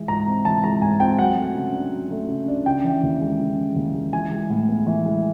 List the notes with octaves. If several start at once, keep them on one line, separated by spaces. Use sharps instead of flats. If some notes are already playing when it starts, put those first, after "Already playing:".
Already playing: E3 G#3
G#2 A#5
C4
E3 A5
G#3 A#5
G#2 G#5
C4 G5
F#3 F#5
A3
C#3
D4
F#3
A3
C#3
D4
C#3 G5
E3
D#2
G#3
C#3
E3
D#2
G#3
E3 G#5
G#3
A2
B3
E3
G#3